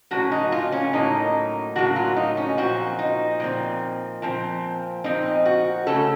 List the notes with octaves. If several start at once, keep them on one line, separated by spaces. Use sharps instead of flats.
A2 F#3 A#3 C#4 F#4
D#4
F4
C#4
A2 F#3 A#3 C#4 D#4
A2 F#3 A#3 C#4 F#4
F4
D#4
C#4
A#2 F3 C4 F#4
D#4
A#2 F3 C4
A#2 F3 C4
A#2 F3 C4 D#4
F#4
C#3 A3 C#4 A4